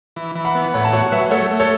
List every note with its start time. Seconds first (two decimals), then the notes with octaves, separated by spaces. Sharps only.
0.16 E3
0.35 E3
0.45 F#5 B5
0.55 B3
0.74 A2 C#5 F#5
0.84 A5
0.93 F#4 C#5 F#5
1.12 F#3 B4 E5
1.31 A3 A4 C#5
1.51 A3
1.60 A4 C#5